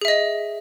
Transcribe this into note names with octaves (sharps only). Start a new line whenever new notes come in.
G#4 D#5 E5